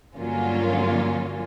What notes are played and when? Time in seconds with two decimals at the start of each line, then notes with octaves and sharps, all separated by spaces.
0.15 G2 D3 F#3 A#3 C#4 F4